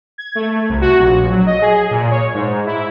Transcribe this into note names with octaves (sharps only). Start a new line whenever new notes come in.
G#6
A3
C2
F#4
A#1
F#3
D#5
G#4
A#2
C#5
G#2
E4